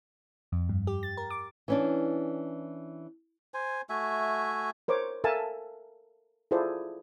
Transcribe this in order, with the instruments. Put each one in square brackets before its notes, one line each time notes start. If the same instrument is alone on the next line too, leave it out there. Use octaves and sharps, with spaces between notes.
[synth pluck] F2
G2
G4
A6
A#4
D6
[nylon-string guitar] E3 C#4 D4
[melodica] C5 G#5
A3 F#4 E5 G#5
[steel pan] A#4 C5 C#5 D6
A4 A#4 E5 F5 G#5 A5
E4 F4 G#4 A4 C5 D5